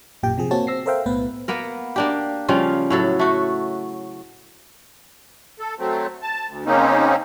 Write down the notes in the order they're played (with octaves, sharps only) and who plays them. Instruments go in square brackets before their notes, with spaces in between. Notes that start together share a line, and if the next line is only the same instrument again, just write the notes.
[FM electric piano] A1 F#2 A#2 G4 G5
C3 F3 G#4
A#3 C4 F#4 C#5 A5
C4 E6 A#6 C7
A4 A#4 C5 E5 F5 G5
B1 A2 B3 B4
[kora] A#3 B3 A#4
A#3 D4 G4
C#3 F3 G3 F4
A2 F#3 A4
A3 F#4
[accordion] A4
F#3 A3 C4
A5
D2
C#3 A#3 C4 C#4 D#4